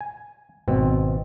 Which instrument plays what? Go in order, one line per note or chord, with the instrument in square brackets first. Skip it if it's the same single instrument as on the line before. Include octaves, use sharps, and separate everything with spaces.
[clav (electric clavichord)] G#5
G#1 B2 C4